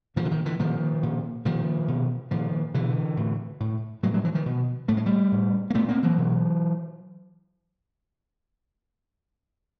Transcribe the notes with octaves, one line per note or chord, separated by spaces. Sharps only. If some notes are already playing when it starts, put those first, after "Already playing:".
A#2 D#3 F3
D3
D#3
D3 E3
A#2 D#3 F3
A#2
A#2 D#3 F3
B2
A#2 D#3 F3
B2 D3 E3
A2
A2
A2 F#3 G#3
F#3 G#3
E3 F#3
D#3 F3
B2
A2 A3
G#3
G3 A3
A2
A#3
A#2 A3 B3
A#3 C4
E3 F#3
B2